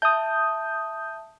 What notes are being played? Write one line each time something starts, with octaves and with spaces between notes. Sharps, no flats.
E5 A5 D#6 G6